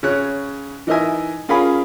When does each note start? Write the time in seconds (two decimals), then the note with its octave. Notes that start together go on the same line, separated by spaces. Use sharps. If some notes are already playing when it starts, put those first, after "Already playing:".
0.03 C#3 C#5 F#6
0.87 E3 D#4 A#4 D#5 E5 G#5
1.49 C#4 F4 G#4 A#4 B5